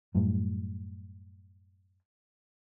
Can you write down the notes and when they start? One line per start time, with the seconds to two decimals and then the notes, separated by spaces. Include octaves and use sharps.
0.15 F#2 A2 G3